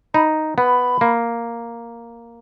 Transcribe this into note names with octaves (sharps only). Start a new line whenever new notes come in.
D#4 B5
B3 B5
A#3